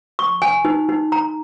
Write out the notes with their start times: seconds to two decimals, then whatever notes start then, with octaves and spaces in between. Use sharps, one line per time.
0.19 C#6
0.42 G#5
0.65 D#4
0.89 D#4
1.12 A#5